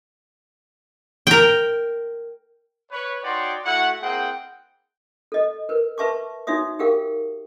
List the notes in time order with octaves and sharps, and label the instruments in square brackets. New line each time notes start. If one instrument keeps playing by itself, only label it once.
[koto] A#4 G5
[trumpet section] B4 C#5
D#4 F#4 C#5 D5 G5 C6
A3 E4 F#4 F#5
A#3 C4 E4 G#4 F#5 G5
[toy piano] A4 D#5
A#4 B4
B4 E5 A5 C#6 D6
D#4 F#4 C#5 E5 D#6
G4 G#4 A#4 F5 G5